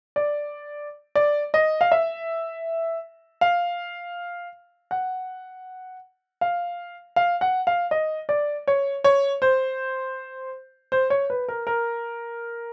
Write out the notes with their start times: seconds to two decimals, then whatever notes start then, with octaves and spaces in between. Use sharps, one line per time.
0.16 D5
1.15 D5
1.54 D#5
1.81 F5
1.92 E5
3.41 F5
4.91 F#5
6.41 F5
7.16 F5
7.41 F#5
7.67 F5
7.91 D#5
8.29 D5
8.68 C#5
9.04 C#5
9.42 C5
10.92 C5
11.10 C#5
11.30 B4
11.48 A#4
11.67 A#4